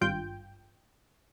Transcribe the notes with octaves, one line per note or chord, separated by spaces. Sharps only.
G#1 G2 F4 G5 G6